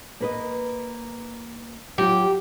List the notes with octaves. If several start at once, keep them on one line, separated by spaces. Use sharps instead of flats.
A#3 B4 D#5
F#3 F4 G4